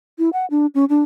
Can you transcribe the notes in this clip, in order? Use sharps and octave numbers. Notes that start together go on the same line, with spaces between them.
E4
F#5
D4
C#4
D4